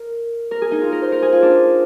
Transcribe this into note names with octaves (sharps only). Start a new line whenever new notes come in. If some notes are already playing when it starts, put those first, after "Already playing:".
Already playing: A#4
A#4
G#4
D#4
F4
A#4
C5
A#4
G#4
F4
D4